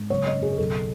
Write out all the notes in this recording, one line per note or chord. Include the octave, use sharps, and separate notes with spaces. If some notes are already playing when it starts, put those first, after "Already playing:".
Already playing: G#2
F#1 C#5
D#5
F#2
G#4
G#4
B1 A4